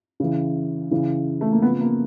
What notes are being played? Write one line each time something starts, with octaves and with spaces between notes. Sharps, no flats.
C#3 E3
C#3 E3
A3
A#3
C#3 F3 B3
A#3